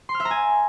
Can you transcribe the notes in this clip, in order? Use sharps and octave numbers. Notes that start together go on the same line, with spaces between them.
C6
F6
E5
A#5
G#5